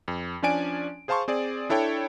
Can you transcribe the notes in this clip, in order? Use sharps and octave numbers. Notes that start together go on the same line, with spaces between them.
F2
F3 C#4 D4 D5 G#5 D7
G#4 C5 F5 A5 C6 C#6
C4 G#4 D5
D4 E4 A4 C#5 G5